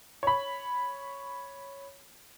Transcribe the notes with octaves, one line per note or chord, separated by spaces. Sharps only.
C#5 B5